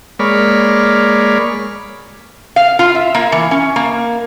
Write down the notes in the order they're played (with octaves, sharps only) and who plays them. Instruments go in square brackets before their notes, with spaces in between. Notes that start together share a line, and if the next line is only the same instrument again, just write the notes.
[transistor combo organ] G#3 A#3 C#5 D5 B5 F6
[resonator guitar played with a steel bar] F5
F4
E5
A#3
E3
C#4
A#3